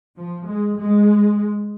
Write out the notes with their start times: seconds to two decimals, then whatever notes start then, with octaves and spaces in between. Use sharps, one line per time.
0.17 F3
0.47 G#3
0.76 G#3